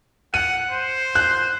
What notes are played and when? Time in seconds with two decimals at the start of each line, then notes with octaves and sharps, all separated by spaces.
0.34 F#5 D#7
0.71 C5
1.15 F#6